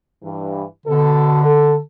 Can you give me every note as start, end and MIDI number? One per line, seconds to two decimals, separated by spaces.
0.23 0.63 43
0.23 0.63 52
0.87 1.40 47
0.87 1.79 50
0.87 1.40 69
1.44 1.74 69